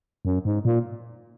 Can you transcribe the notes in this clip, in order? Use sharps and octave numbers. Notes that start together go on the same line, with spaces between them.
F#2
G#2
A#2